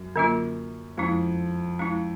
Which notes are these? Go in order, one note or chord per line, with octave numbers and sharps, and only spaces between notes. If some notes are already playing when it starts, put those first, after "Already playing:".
Already playing: F#2
D3 F#3 A#3 C#4 F4
F2 G#3 C#4 E4
G#3 C#4 E4